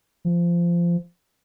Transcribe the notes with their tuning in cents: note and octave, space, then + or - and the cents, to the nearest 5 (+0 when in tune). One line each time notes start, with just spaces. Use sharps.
F3 -20